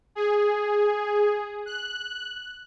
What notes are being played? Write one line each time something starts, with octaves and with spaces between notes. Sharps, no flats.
G#4
F#6